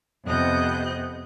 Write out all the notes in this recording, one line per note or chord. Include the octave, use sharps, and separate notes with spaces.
F2 C3 B3 D#5 F#6 G6